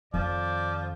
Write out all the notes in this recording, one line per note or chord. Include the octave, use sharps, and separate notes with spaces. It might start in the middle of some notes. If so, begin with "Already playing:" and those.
F2 D#3 F3 D5